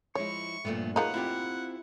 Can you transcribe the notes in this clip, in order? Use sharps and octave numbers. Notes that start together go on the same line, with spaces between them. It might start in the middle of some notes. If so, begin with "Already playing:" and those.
F3 G#3 E4 C#5 C#6
G2 A#2 F3 A3 B3
F3 A#3 D#4 G#4 B4 C#5 F#5
C4 E4 F4 G4